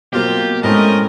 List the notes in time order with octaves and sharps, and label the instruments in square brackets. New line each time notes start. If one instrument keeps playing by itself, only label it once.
[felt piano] B2 F#3 A#3 [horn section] C4 F4 [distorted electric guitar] G4
[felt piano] A2 C#4 [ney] G#3 [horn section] A3 C4 A#4 [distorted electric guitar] D#5